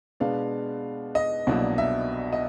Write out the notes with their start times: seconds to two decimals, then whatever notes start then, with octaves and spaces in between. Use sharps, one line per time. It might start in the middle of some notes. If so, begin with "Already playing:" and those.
0.20 B2 G#3 B3 D4 F5
1.15 D#5
1.47 C2 B2 F#3 A#3 D4
1.78 E5
2.33 D#5